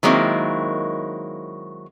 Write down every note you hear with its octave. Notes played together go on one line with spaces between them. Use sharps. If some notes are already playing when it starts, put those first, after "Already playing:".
D#3 F#3 G#3 A#3 C4 E4